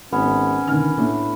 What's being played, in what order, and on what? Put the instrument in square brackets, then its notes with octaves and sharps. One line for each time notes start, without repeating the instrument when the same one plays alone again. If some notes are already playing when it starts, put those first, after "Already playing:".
[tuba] G#1 [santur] B3 [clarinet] C#4
[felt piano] D3 F6 [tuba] D#3
[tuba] A2 [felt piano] A3 D4